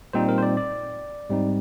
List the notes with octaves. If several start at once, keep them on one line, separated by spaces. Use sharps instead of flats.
A#2 G3 C4 D#4 C5
A#4
C5
D5
D5
G#2 G3 C4 D#4